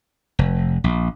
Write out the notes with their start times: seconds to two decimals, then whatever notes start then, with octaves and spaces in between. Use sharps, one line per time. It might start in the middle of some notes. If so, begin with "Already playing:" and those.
0.39 F1
0.84 A#1